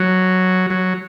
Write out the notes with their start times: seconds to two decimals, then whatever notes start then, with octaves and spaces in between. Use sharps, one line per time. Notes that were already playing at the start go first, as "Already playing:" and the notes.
Already playing: F#3
0.70 F#3